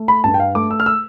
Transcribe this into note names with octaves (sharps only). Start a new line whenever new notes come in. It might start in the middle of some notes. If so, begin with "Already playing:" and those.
Already playing: A3
B5
G2 A5
G5
F5
A3 D6
E6
F6
E6